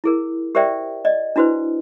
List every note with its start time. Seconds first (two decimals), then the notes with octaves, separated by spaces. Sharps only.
0.04 E4 G#4 A#4
0.55 G4 A#4 C5 D5 E5 G5
1.05 D5 D#5
1.36 D4 E4 F#4 B4 C5